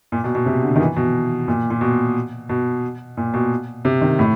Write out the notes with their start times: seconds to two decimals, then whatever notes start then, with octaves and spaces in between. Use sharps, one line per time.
0.12 A#2
0.24 B2
0.35 B2
0.46 C3
0.62 D3
0.76 D#3
0.80 E3
0.96 B2
1.48 A#2
1.70 A#2
1.81 B2
2.49 B2
3.17 A#2
3.34 B2
3.85 C3
4.01 D#3
4.19 A2